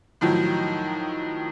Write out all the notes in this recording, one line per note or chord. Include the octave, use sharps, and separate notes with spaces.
A2 D#3 F3 F#3